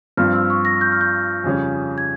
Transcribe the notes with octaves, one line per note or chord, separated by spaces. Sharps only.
G2 F3 C4 F6
E6
C#6
A#6
G6
F6
G6
F2 C#3 G3 C#4
G#6